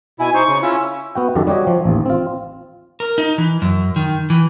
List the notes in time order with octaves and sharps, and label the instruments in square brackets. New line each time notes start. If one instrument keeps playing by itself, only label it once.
[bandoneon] B2 E4 [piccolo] G#5
[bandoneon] D#4 C5 [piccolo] C#6
[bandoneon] C#3
[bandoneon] C#4 E4 F4 [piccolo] E6
[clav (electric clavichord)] B3 F#4 G5
F#2 D#3 F#4 G4 A4
G3 F#4 G4 C#5 D#5
F3
A1 D#2
C4 F4
[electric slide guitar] A#4
D#4
E3
F#2
D#3
E3